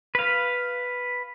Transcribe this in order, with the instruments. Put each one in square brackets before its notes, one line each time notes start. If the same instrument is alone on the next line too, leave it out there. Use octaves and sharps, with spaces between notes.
[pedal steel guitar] B4 F5